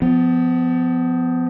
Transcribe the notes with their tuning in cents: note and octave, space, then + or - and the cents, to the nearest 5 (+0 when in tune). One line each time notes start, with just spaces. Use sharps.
F3 +0 B3 +30